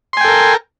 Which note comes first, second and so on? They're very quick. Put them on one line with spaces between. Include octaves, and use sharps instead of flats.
C6 G#5 G5 A4 A#4